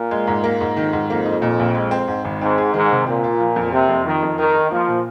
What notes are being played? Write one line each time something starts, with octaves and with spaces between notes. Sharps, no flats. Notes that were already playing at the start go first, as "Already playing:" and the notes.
Already playing: A#2
G#3
G#2
A#3
G#2
F2 D#3
G#2
F2 A#3
D#4
A#2
A#1
G#3
C4
G#2
G#1
G#2 C4
G#4
G#2 D#3
C3
A#2 C4
F4
F3
F2
C3 A#3
F2
D#3 F3
F2
D#3 D#4
A#4
F3 A#3
A#2